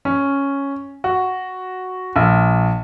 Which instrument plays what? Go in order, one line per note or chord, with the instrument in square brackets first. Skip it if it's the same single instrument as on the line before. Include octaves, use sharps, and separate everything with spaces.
[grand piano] C#4
F#4
A#1